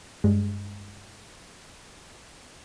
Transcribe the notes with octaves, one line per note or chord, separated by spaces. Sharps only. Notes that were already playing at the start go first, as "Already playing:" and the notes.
G2 G#3